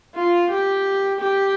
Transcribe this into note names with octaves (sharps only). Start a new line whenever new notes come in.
F4
G4
G4